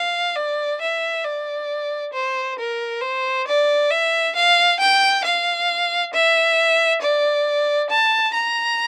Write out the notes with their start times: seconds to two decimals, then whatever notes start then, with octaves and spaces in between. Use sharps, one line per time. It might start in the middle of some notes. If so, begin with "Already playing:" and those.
Already playing: F5
0.36 D5
0.81 E5
1.25 D5
2.13 C5
2.59 A#4
3.02 C5
3.47 D5
3.90 E5
4.36 F5
4.80 G5
5.24 F5
6.13 E5
7.02 D5
7.90 A5
8.34 A#5